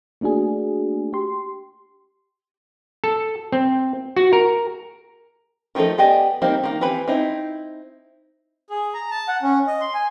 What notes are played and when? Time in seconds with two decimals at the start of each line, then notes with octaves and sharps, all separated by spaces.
0.21 A3 A#3 D4 F#4 G#4
1.13 G4 C6
3.04 A4
3.52 C4
4.17 F#4
4.33 A#4
5.75 D#3 F3 A3 D#4 A4
5.98 B3 G4 D5 D#5 G#5
6.42 G3 A#3 C4 D#4 G4
6.64 D#3 A#3
6.81 E3 C4 G4 B4 B5
7.08 C4 D#4 E4
8.70 G#4
8.94 A#5
9.11 A5
9.28 F#5
9.43 C#4
9.67 D#5
9.81 C6
9.94 G#5